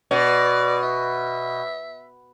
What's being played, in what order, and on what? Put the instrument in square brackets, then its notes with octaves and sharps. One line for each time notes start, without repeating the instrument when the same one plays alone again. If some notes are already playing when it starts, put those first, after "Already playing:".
[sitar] B2 [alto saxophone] D5
[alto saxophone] E5